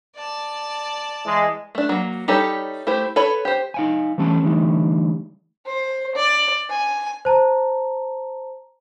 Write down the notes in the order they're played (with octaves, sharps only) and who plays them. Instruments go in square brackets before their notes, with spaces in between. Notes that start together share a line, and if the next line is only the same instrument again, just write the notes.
[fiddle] D5 A5
[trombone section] E3 G#3
[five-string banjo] A3 D4
F#3 A#3
G3 D#4 G4 A4 C#5
A3 E4 G4 C5
A4 B4 C#5 B5
G4 C5
[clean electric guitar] D#4 F5 G#5
E3 G3 A3 C#4 A5
D3 E3 G3 A3 D#4
[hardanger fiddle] C5
D5
G#5
[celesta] C5 A5 A#5